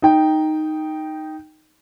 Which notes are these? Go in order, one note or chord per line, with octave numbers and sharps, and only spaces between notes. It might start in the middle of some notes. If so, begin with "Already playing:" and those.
D#4 G5